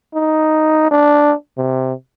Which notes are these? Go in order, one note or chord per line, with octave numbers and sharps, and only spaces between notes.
D#4
D4
C3